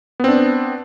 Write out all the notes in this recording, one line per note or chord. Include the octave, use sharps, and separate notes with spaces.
B3 C4 D4